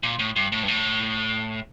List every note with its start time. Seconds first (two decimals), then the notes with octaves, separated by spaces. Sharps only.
0.03 A#2
0.19 A2
0.36 G2
0.52 A2
0.63 G2
0.68 A2